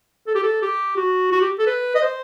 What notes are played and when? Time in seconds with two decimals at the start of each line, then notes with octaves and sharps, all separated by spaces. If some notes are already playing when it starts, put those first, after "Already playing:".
0.27 A4
0.35 G4
0.43 A4
0.62 G4
0.97 F#4
1.32 F#4
1.41 G4
1.59 A4
1.66 B4
1.95 D#5
2.02 C5